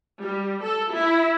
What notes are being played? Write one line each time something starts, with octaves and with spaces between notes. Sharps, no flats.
G3
A4
E4